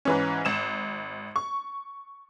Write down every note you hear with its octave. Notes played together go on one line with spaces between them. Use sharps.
G#2 E3 C#4
G#1 E7
C#6